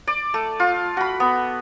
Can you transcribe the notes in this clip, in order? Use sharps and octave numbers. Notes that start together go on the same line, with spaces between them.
D5
A3
F4
F#4 B5
B3